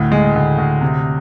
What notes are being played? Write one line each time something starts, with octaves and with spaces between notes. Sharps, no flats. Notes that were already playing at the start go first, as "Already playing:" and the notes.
Already playing: D2 A2
G#3
D2
D2
C3